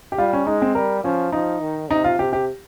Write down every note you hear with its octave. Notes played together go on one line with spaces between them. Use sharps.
G4
G3 F4
C#4
G#3 D#4
C4
G3 A#4
F3 C#4
F3 D#4
D#3
C3 D#4
F4
C3 G4
G4